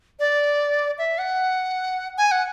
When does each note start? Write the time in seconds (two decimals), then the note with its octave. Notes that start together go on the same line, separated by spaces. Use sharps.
0.20 D5
0.98 E5
1.18 F#5
2.18 G#5
2.31 F#5